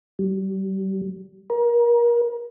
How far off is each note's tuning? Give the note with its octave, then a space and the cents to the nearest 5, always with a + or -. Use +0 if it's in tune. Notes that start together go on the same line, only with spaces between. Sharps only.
G3 -35
A#4 +30